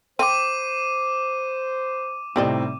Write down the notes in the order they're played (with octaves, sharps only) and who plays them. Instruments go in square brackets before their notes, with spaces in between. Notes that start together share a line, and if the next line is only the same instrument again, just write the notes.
[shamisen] C4 [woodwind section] C5 [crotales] D6 D#7
[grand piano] A2 C3 C4 [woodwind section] G3 D#4 [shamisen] G4 D5 D#5